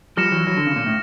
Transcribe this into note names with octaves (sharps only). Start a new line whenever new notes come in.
F3 G3 F6 A#6 C#7 E7
E3 F#3
E3 F#3
D3
C#3
A#2
A2